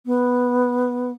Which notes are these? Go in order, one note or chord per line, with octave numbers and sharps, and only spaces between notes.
B3